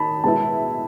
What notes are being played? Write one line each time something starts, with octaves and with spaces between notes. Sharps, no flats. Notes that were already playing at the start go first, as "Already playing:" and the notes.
Already playing: D#3 D#4 A5 B5
B2 G#3 B3 E4 A5